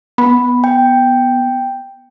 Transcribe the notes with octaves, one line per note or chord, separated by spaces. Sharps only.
B3 B5
G5